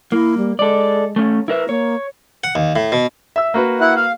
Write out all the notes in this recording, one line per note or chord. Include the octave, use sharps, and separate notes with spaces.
A#3 E4
G3
G#3 A4 D5
A3 C#4
E4 A#4 B4 E5
A#3 C#5
F#5
D#2
A2
B2
E5 E6
A#3 F#4 B4
E4 F#5
F5